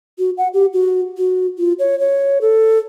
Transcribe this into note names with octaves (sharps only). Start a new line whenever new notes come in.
F#4
F#5
G4
F#4
F#4
F4
C#5
C#5
A4